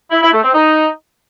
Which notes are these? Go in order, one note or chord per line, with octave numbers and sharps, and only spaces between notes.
E4
E4
A3
C4
D#4